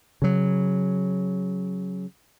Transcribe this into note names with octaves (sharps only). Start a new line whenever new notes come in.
C#3 F#3